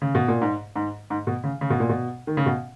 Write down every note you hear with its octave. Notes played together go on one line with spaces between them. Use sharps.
C#3
B2
A#2
G#2
G#2
G#2
B2
C#3
C#3
B2
A#2
B2
D#3
C#3
B2